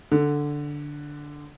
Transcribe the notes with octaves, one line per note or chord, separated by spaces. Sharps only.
D3